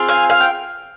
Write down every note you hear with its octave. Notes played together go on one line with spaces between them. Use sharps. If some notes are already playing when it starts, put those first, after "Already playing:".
Already playing: C4 F4 G#4
F5 G#5
F5 G#5
G5